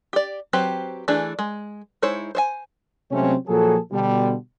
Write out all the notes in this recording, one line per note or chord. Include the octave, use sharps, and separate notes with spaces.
G4 D5
F#3 C4 G4 B4 C5
E3 A3 D4 G#4
G#3
G#3 D#4 E4 C5 C#5
C5 C#5 G#5
C3 F#3 G#3 A3 C4 C#4
A#2 F3 F#3 G#4 A4
B2 D3 G3